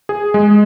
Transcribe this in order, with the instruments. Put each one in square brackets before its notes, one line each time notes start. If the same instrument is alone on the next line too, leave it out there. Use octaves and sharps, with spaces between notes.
[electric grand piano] G#4
G#3